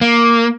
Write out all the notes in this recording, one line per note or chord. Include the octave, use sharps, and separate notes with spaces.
A#3